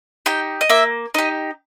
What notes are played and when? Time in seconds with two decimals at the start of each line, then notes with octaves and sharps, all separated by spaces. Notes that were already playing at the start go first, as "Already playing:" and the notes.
0.26 D#4 G4 G5
0.61 D#5
0.69 A#3 E5
1.14 D#4 G4 D#5